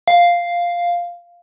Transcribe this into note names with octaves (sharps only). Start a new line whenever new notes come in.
F5